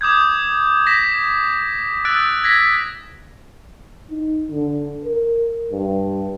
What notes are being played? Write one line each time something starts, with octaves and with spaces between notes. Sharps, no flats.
D6 D#6 G6 G#6
A#6 B6 E7
D#6 E6 F#6 A6 D7
G#6 A#6 B6
D#4
D3
A#4
G2